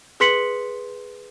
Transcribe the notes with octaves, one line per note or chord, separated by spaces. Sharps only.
G#4 B4 C6 B6 C#7 F#7